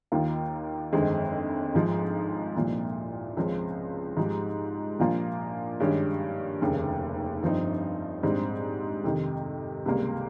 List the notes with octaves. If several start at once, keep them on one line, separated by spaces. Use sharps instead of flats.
D#2 D#3 A#3 F4
G1 F2 D#3 G#3 C4
G#1 G#2 F3 G#3
C2 A#2 F3
C#2 C#3 F3 C4
G#2 F3 G#3 D#4 G4
A#1 A#2 F3 A#3 F4
G2 D#3 G#3 C#4 G4
F1 D#2 C#3
G1 G2 F3 C4 D#4
A#1 G#2 G3 C4
F2 C3 D#3
C#2 C3 G3 A#3